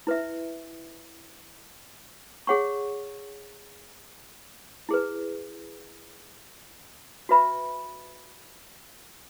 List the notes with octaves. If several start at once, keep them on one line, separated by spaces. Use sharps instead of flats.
E4 B4 E5
G#4 C#5 F#5 C#6
E4 G#4 B4
F#4 B4 E5 B5